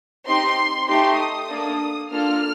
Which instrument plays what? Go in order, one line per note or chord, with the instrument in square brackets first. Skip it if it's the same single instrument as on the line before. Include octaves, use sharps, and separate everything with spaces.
[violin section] C4 D#4 G4 C6
A3 D#4 G4 C6
D#6
A#3 D4 A4
A#3 D4 F4 A4 F6